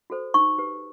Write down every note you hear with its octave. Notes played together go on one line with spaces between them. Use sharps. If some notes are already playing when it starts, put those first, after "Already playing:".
F#4 A4 C5
D#4 C#6
G4 B4